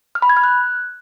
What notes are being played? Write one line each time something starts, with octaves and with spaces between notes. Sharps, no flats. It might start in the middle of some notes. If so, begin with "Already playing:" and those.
F6
B5
G#6
F6
F#6